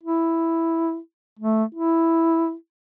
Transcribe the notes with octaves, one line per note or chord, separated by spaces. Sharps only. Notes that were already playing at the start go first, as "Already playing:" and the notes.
E4
A3
E4